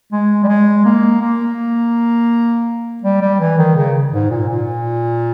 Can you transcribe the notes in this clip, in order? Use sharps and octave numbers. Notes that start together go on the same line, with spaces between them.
G#3
G3
G#3
A#3
A#3
G3
G3
E3
D#3
C#3
G#2
A#2
A#2